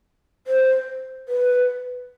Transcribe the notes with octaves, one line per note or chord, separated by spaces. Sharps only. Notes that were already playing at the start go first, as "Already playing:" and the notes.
C5
B4